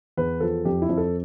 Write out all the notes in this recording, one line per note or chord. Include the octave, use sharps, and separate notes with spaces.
E2 B4
F3 A4
F2 G4
E4
F2
A4